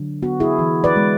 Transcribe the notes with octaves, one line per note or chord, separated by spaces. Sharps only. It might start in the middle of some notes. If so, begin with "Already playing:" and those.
Already playing: D3 F#3
B3 F#4
E4 G#4
E3
B4 D5
G#3